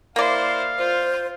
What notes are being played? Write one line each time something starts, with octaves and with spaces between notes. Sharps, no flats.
A#3 E4 C5 D5 F5
F4 C5